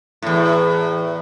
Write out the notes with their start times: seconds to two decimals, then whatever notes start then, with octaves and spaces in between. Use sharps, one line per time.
0.22 E2 A2